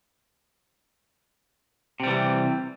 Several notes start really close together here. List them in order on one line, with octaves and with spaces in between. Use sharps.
C3 G3 E3